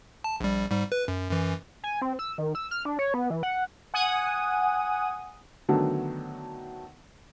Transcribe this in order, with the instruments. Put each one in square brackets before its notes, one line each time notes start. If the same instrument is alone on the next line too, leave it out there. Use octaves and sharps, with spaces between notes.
[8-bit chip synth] A5
A#1 G3
G#2 G3
B4
F#2
F#2 E3
[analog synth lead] G#5
C4
E6
D#3
E6
F6
D4
C#5
B3
E3
F#5
[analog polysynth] F#5 G#5 D#6
[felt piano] D3 D#3 F#3 A3 B3 D4